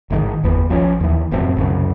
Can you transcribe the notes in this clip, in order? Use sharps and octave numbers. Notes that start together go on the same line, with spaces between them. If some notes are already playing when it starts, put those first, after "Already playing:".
A1 G#2 D3 D#3
G1 E2 B3
A#1 F3 C4 C#4
D#2 E3
F1 F#2 A2 C4
C2 F#2 C#3